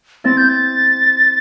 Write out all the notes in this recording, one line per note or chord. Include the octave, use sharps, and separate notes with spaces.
C4 E4 A6
G6
A6